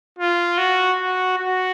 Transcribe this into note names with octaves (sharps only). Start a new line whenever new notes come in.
F4
F#4
F#4
F#4